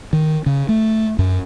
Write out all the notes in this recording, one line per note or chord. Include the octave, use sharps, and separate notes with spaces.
D#3
C#3
A3
F#2